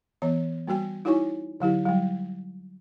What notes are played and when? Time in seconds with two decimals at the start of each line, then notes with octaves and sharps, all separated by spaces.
0.22 E3 B3 C#5
0.67 G3 A#3 F#4 G5
1.05 D#4 E4 F#4 C#5 G#5 C#6
1.60 D3 F#3 E4 G4
1.86 F#3 G3